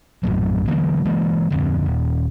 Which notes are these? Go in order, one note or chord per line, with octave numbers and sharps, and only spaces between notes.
A#1 F#2 A2 F#3
D3 E3 F#3 A#3
E3 G#3 A#3
D1 F2 D3 C4
D#1